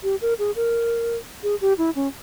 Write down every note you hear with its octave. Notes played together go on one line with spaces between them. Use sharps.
G4
A#4
G#4
A#4
G#4
G4
E4
C#4